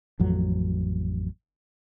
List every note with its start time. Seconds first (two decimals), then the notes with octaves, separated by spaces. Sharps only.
0.20 A1 F2 F#3